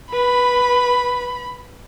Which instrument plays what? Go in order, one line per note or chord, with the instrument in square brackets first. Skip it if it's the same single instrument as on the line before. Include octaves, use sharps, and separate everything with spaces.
[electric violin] B4 [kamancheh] B5